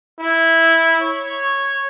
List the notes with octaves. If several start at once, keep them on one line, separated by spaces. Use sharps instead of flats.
E4
C#5